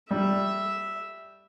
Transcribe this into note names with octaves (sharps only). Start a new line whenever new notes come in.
G3 E5